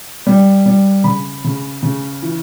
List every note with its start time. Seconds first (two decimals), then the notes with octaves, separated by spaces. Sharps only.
0.27 G3
0.66 G3
1.04 C#3 B5
1.44 C#3
1.83 C#3
2.22 E3